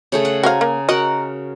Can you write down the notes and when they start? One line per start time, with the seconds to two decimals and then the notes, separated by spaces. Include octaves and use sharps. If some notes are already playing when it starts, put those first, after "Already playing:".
0.12 C#3 A3 G#4
0.25 F#5
0.43 F#4 C5 F5 G#5 A#5
0.61 A#3
0.89 F#4 A#4 D#5 F#5